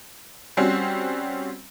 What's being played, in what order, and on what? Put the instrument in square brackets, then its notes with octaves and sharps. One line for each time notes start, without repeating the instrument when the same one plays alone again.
[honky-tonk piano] G3 C4 C#4 F#4